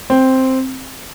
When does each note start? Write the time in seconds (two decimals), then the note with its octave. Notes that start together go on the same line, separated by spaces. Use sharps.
0.10 C4